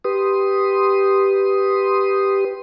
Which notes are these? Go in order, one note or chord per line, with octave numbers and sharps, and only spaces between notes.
G4 B4 C6 D#6